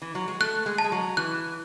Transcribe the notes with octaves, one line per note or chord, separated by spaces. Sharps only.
E3
F#3
G#3
A3 F#6
G#3
A5
G#3
F#3
E3 F#6